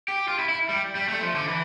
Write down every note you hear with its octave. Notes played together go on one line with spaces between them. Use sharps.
G4
F4
E4
E4
G3
G3
A3
F3
D3
E3